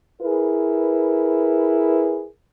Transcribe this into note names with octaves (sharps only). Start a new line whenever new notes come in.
E4 G#4 A#4 B4